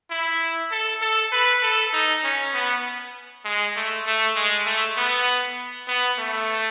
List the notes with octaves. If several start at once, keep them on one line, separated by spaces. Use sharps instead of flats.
E4
A4
A4
B4
A4
D#4
C#4
B3
G#3
A3
A3
G#3
A3
B3
B3
A3